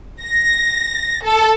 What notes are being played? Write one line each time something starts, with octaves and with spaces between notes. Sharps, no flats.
A#6
A4